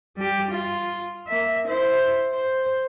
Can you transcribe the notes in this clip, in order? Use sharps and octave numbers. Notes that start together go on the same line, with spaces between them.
G3 G4
F4
A#3 E5
E4 C5
C5